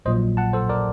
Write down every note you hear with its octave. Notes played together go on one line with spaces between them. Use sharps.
A#1 A#2 F#3 C5 D#5
F#5 A5
A4 C5
A#4 D5